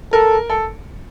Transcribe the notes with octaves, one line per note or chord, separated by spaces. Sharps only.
A4 A#4
A4